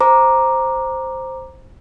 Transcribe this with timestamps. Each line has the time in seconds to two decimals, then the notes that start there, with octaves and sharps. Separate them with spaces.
0.01 C5 A#5 D6